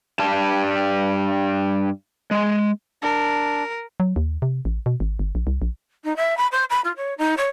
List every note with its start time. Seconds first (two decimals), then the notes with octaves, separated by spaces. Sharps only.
0.19 G2 G3 A5
2.31 G#3
3.02 D4 A#4
4.00 F#3
4.16 D#2
4.42 C3
4.65 A1
4.86 B2
5.00 G#1
5.19 G1
5.35 A#1
5.47 C2
5.62 A#1
6.04 D#4
6.17 E5
6.37 B5
6.52 C5
6.70 B5
6.84 F4
6.97 C#5
7.18 D#4
7.37 C#5